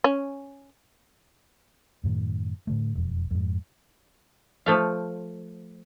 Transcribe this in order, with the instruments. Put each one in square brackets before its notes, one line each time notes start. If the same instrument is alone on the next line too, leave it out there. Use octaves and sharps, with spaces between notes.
[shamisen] C#4
[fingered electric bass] F#2 A2 D#3
A2 D3 A3
E1 F2
F2 G#2
[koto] F3 A3 F5